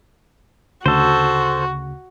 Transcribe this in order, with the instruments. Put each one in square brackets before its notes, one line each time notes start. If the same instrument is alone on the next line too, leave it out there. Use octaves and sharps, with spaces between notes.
[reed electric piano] D2 C#3 [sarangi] F#4 [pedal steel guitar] A4 C5